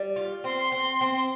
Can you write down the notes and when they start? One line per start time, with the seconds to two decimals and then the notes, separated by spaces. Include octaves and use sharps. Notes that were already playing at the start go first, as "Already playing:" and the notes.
Already playing: G3
0.16 F4
0.44 C4 C6
0.72 C4
1.01 C4